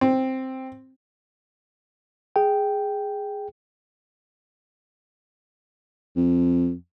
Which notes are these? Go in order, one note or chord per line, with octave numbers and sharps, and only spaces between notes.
C4
G#4 G5
F2